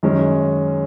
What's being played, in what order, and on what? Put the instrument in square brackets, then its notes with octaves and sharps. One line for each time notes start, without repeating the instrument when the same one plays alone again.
[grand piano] F#2 D#3 G#3 C#4